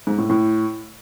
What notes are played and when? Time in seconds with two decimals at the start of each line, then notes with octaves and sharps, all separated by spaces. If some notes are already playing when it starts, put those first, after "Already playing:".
0.07 G#2
0.18 A2
0.30 A2